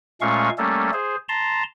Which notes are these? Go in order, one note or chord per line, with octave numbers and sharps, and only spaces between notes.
A#2 G#3 A3 C#4 F5 C#6
G3 A3 A#3 C#4 A4
G#4 C5
A5 A#5 C6